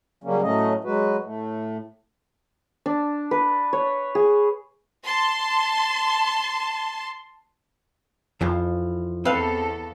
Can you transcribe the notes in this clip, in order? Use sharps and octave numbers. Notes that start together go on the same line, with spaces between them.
C#3 F#3 G3 A#3 C#4
A2 F#3 A3 C#4 D#5
F#3 G#3 F#4 B4
A2 A3
D4
B4
C#5
G#4
A5 C6
F2 E3 F3
E2 C4 A4 B4 F5